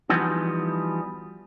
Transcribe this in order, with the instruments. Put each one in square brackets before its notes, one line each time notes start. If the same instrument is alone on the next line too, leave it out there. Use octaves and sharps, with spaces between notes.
[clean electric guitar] E3 F3 G3 B3 D#4 F#4